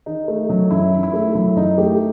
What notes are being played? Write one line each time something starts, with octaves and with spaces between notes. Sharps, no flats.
D#3 D#4
A3
F#3
F#2 E4
D#3
E4
A3
F#3 E4
F#2 D#4
A3 G4